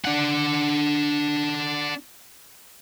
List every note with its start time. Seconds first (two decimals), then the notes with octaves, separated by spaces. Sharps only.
0.05 D4 F#5